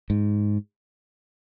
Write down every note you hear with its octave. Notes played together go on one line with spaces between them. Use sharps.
G#2